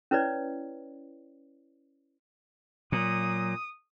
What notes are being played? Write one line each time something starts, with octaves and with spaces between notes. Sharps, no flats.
C#4 E4 B4 C#5 D5
A#2 F#3 D#6